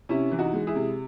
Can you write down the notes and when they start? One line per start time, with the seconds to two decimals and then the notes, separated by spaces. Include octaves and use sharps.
0.09 C3 C#4 E4
0.32 E3
0.39 D#4 F#4
0.53 G#3
0.67 E4 G#4
0.75 C3